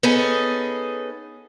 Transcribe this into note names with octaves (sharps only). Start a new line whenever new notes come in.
B3 C#4 D#4 G#4 A4